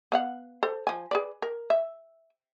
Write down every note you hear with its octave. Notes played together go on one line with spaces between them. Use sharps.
B3 F5 F#5
A4 C5
F3 G#5
G#4 B4 D5
A#4
E5